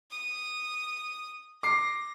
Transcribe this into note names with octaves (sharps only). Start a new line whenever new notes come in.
D#6
D6 A#6 C7